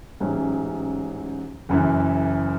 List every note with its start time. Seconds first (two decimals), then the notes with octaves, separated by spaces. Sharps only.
0.20 A1 G#2 F#3 C#4
1.69 F#1 F#2 E3